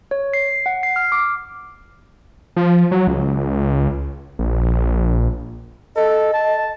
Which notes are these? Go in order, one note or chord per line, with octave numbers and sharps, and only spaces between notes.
C#5
C7
F#5
C7
F6
D6
F3
F#3
C#2
A#1
A4 D#5
A5